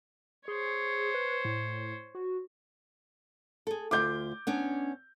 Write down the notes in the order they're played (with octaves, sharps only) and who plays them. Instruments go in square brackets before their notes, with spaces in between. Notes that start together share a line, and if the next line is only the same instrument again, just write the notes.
[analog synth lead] G#4 [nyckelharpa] C5 C#5
[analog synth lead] B4
A2
F#4
[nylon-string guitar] G#4 A4
[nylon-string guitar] D2 F4 [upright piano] D6 G6
[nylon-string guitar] B3 C#4 D4